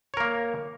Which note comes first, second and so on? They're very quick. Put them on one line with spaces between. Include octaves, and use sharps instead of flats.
C#5 A#4 A#3